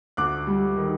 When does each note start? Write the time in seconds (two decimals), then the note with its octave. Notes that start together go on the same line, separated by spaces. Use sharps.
0.17 D2 D6 F#6
0.47 G3
0.76 D#3